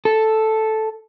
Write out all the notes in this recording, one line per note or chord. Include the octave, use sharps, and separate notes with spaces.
A4